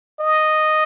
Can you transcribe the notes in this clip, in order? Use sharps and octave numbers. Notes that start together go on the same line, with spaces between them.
D#5